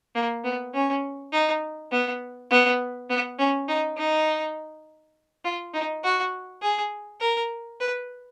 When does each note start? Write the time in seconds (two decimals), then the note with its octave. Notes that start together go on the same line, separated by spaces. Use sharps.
0.15 A#3
0.45 B3
0.74 C#4
1.32 D#4
1.92 B3
2.51 B3
3.10 B3
3.39 C#4
3.69 D#4
3.98 D#4
5.45 F4
5.74 D#4
6.04 F#4
6.63 G#4
7.21 A#4
7.81 B4